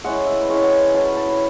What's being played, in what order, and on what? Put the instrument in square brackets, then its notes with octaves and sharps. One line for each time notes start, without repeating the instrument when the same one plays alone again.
[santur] G#3 C#4 E4 F#5
E5
B4
G#3 C#4 E4 C#5
F#5
G#5
F#3 C#4 E4 A5
B5
A5
B5